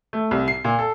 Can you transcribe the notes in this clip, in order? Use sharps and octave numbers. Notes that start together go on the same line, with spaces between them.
A3
C2
C7
A#2
A4